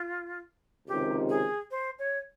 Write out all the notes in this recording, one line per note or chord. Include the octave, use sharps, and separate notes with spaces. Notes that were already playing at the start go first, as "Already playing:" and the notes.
Already playing: F4
C#2 C3 D#3 G4
G#4
C5
C#5